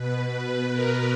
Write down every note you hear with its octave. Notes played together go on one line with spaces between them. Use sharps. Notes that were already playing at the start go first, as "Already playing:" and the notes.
Already playing: B2 B4
B4
A#4